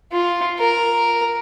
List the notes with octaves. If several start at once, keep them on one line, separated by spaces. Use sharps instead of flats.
F4
A#4